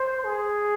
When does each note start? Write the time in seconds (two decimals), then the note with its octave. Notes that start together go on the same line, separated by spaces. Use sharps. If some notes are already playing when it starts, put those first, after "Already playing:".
Already playing: C5
0.24 G#4